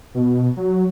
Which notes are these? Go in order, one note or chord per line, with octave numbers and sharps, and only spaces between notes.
B2
F#3